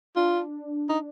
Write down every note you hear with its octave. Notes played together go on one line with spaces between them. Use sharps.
D4 F4
D#4